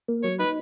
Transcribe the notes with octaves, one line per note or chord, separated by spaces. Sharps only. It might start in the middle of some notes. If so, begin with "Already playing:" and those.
A#3
F#3 C#5
D#4 B4